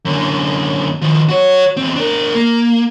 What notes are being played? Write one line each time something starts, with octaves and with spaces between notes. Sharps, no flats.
F#2 D3
D#3 F3
F#4 C#5
E2 C4
D4 A#4
A#3